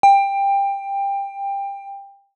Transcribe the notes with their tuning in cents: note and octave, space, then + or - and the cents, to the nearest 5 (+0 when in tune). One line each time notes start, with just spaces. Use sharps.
G5 +20